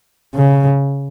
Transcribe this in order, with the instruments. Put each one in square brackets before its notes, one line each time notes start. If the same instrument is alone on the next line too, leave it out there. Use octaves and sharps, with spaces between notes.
[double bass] C#3